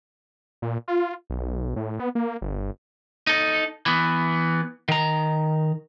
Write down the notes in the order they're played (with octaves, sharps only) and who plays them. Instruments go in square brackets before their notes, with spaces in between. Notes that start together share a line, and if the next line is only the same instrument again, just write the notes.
[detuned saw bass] A#2
F4
B1
A2
B3
A#3
G1
[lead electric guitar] D#4 A4
E3 B3
D#3 A#5